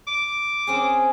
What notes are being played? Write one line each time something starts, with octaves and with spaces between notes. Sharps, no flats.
D6
C4 C#4 G#4